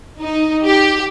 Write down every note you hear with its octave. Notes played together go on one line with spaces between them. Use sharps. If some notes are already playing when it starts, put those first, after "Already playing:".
D#4
G4